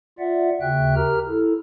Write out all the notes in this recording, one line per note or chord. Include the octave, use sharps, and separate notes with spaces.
F4 D5 E5 F#5
D#2 C#3 F#4 E5 G5 F#6
G4 A#4 A#5 F6
E4 A4